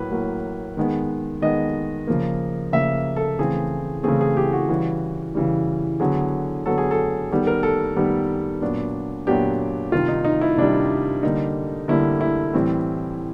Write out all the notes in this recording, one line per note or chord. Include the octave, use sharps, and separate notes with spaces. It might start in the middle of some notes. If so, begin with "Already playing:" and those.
Already playing: A2 F#3 A#3 B4
A2 F#3 A#3
D#3 G#3 B3
D#3 G#3 B3 D#5
C#3 F3 A#3
C#3 F3 A#3 E5
A4
C#3 E3 A3 C4 G#4
C#3 E3 A3 C4 G#4
G#4
G4
F#4
C#3 E3 G3
C#3 E3 G3
D3 F#3 B3 G#4
D3 F#3 B3 A4
G#4
A4
D#3 G3 B3 A4
A#4
A4
D#3 G3 B3
A#2 F#3 B3 D4
A#2 F#3 B3 D4 G4
C3 D#3 G3 F4
D#4
D#4
E4
C3 D#3 G3 D4
D3 G3 A#3 D#4
D3 G3 A#3 E4
E4
A2 E3 G3 C4